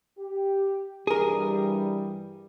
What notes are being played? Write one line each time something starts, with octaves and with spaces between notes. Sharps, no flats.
G4
G2 E3 G3 G#4 A#4